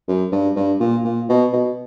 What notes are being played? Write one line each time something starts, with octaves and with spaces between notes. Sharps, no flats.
F#2
G2
G2
A#2
A#2
B2
B2